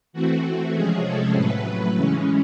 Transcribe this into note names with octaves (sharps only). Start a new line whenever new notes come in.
E3 A3 C4 F#4
F#4
C3 F3 G#3 C#4 G#4
A4
A2 F#3 A3 B4
C#3 E3 G#3 C#4